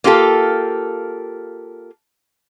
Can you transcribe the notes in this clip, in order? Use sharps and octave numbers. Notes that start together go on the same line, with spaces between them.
A#3 F4 G4 A4